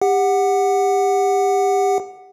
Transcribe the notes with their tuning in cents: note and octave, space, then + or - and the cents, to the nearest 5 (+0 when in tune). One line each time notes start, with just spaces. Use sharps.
G4 +25 F#5 +0